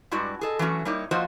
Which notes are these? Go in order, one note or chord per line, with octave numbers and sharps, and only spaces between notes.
G2 G#3 E4 F#4 D5
G#4 A4 D#5
E3 F#3 A3 C#4 F#4
G3 A#3 D#4 E4 C#5
F3 A#3 F4 F#4 C5 D#5